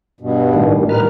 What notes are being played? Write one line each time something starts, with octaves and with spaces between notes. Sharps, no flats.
G2 B2
A2 D#3 G3
A#4 B4 F6